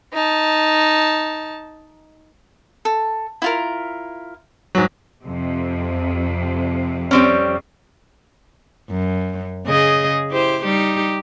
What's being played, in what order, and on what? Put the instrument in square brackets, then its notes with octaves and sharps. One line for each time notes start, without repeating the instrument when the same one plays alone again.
[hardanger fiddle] D#4 A5
[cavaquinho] A4
E4 F4 A#4
[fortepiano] G#2 F#3
[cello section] F2 C3
[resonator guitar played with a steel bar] G3 C4 C#4
[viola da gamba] F#2
C#3 G#4 D#5
E4 G4 C5
G3 D#4 G4